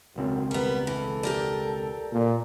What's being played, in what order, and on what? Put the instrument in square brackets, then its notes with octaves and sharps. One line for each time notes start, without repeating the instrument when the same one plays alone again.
[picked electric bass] E1 C#2 C4 [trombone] F#2
[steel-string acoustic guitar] G3 B3 [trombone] A#4
[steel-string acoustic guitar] E3 [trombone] A4
[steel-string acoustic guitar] G4 A#4 D5
[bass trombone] A#2